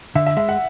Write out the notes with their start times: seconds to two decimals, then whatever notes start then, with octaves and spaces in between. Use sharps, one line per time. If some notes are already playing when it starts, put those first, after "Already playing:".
0.15 D3 E5
0.26 E5
0.37 G#3 E5
0.49 F#5